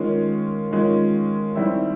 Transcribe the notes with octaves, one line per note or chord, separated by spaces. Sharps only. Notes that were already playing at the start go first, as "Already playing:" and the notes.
Already playing: D#3 G#3 C#4 F4
D#3 G#3 C#4 F4
D#2 D#3 G3 C4 E4